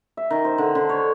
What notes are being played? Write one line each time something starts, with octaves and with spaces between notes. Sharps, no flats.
E5
D#3
C5
D3
D3
C#5